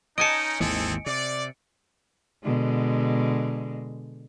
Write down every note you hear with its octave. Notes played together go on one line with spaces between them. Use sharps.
C#4 D#4 D#5 G#5 A5 C#7 D7
G#1 D#2 E3 C4 G#4 A4
C3 D5
B2 D3 G#3